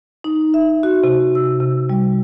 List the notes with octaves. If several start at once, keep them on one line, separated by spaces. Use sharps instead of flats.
D#4
E5
F#4
C3
E6
C3
G3